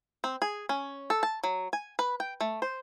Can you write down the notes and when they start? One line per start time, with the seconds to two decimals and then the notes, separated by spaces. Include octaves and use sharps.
0.24 C4
0.42 G#4
0.69 C#4
1.10 A4
1.23 A5
1.44 F#3
1.73 G#5
1.99 B4
2.20 G5
2.41 A3
2.62 C5